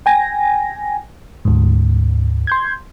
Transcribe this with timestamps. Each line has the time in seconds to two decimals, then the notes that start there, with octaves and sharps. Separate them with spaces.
0.06 G5 G#5 A#6
1.45 D2 G#2
2.47 C6 G6 G#6